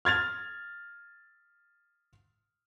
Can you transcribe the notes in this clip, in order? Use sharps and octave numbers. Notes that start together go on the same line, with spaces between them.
F6 G#6 A6 F7